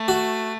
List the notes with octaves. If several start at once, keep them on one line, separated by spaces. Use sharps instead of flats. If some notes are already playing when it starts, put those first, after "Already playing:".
Already playing: A3
F#4